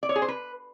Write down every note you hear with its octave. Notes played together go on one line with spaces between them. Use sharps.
D5
C#5
G#4
C5
B4